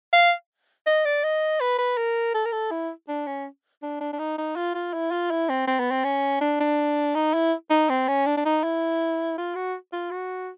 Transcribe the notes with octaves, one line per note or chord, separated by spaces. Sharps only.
F5
D#5
D5
D#5
B4
B4
A#4
A4
A#4
A4
E4
D4
C#4
D4
D4
D4
D#4
D#4
F4
F4
E4
F4
E4
C4
C4
B3
C4
C#4
D4
D4
D#4
E4
D#4
C4
C#4
D4
D4
D#4
E4
F4
F#4
F4
F#4